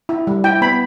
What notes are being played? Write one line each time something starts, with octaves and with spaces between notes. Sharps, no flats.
E4
G3
E4 G5
B3 B5